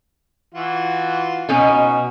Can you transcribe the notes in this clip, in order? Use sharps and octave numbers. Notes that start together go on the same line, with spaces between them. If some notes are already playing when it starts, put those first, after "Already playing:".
E3 F4 F#4
B2 C#4 D#4 F#4